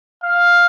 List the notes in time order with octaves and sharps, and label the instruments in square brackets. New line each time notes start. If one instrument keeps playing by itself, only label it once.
[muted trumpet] F5